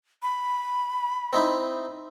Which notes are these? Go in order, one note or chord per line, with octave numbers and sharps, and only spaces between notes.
B5
C4 D#4 E4